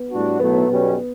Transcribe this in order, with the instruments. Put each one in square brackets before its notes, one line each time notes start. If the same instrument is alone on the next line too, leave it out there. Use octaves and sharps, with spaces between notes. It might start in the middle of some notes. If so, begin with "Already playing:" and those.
Already playing: [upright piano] B3
[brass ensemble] A2 G3 D4 F#4
[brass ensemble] B1 A2 F#3 A3 [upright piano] B3
[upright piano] B3
[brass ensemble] B1 B2 G3 C#4